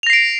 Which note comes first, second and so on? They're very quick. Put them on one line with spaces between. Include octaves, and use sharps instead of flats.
F7 A#6 C7 D7